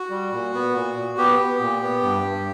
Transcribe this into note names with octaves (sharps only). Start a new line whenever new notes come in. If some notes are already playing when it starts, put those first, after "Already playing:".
Already playing: F#4
G3
A#2
B3
A#2
A#2
B3 G4
B3
A#2
B3
G2
G2